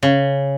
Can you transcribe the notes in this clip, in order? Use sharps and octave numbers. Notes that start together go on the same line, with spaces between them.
C#3